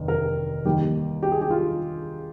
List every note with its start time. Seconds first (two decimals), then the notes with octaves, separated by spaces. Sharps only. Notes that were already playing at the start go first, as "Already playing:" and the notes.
Already playing: F1 D#2 D#3
0.08 A#4
0.65 D#2 D#3 G3 G4
1.23 G4
1.32 G#4
1.41 G4
1.50 F4